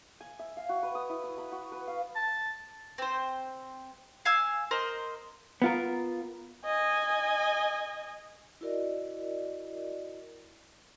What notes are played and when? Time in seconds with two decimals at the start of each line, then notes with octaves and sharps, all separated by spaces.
0.21 G#5
0.39 E5
0.57 F5
0.69 F#4
0.83 B4
0.95 D#6
1.09 E4
1.23 D#6
1.38 B5
1.52 F#4
1.72 B4
1.87 F5
2.16 A5
2.98 C4 C5
4.25 F5 G#5 E6
4.71 A#4 C5 D#5
5.62 B3 F4 A#4
6.66 D#5 G#5
8.61 E4 F#4 A#4 D5 D#5